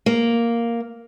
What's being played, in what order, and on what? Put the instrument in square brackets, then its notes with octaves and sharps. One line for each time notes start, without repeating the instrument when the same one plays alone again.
[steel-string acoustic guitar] A#3